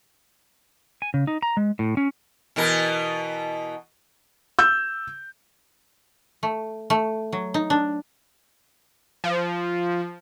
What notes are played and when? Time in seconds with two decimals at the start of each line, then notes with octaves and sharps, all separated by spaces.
1.02 G#5
1.14 C#3
1.27 D#4
1.43 A#5
1.57 G#3
1.79 A2
1.97 C#4
2.56 B2 E3 A#4
4.59 E6 G6
6.43 A3
6.90 A3
7.32 F#3
7.54 D#4
7.70 D4
9.24 F3